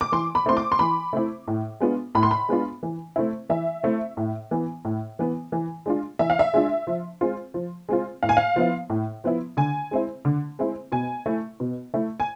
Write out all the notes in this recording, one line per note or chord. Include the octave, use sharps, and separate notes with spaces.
D6
E3 C6
B5
A3 C4 E4 C6
D6
C6
E3 B5
A3 C4 E4
A2
G#3 B3 D4 F4
A2 B5
C6
B5
G#3 B3 D4 F4
E3
A3 C4 E4
E3 E5
A3 C4 E4
A2
E3 B3
A2
E3 B3
E3
G#3 D4 F4
E3 E5
F5
E5
G#3 D4 F4
F3
G#3 C4 F4
F3
G#3 C4 F4
A2 F5
G#5
F5
F3 B3 E4
A2
F3 B3 E4
D3 G#5
G#3 C4 E4
D3
G#3 C4 E4
B2 G#5
A3 E4
B2
A3 E4
G#5